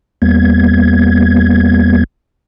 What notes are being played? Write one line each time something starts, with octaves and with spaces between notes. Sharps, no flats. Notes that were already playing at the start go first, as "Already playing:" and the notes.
E2 G3 A#3 B3 G#6